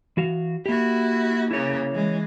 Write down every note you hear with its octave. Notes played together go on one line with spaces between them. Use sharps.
E3 F#4 F5
A#3 E4 F#4 G4
C#3 A#3 E4 C#5
E3 G#3